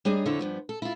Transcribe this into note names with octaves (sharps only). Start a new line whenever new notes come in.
G3 D4 G#4 C#5 D#5 A#5
F2 D3 F3 E4 C#5
G2 F3 B3
A4
E4 F4